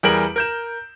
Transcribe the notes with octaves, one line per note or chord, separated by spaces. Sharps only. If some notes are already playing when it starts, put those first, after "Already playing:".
E2 G3 G#4 A#4 D7 F#7
A#4 G6 E7